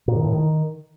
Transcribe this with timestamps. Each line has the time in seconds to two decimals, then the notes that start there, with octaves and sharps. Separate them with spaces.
0.08 A#2
0.16 D#3
0.24 A2
0.33 D#3